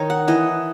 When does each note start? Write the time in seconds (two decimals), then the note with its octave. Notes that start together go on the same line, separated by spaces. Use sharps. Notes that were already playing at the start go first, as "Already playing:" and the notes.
Already playing: D#3 D#4 C#5
0.10 F#5
0.28 E3 D#5